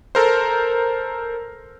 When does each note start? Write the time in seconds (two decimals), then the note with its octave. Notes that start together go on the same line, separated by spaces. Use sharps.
0.15 A4 A#4 C5